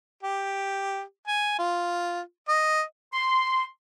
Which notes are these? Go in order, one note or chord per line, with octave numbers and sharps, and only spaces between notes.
G4
G#5
F4
D#5
C6